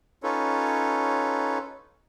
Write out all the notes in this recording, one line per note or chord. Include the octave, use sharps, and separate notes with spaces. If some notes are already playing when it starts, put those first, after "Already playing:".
C#4 D#4 F4 A4 B4 C#5